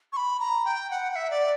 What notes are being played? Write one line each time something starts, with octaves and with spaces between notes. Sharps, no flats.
C#6
B5
A#5
G5
F#5
F#5
E5
D5